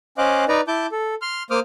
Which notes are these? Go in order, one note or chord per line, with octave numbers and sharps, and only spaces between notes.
C#4 C5 D#5 F5 D6 F#6
D#4 B4 D5 A#5
E4 A5 D6 G6
A4
C6 F6
A#3 C5 D6 D#6 F6